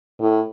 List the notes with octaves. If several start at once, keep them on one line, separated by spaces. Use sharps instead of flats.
A2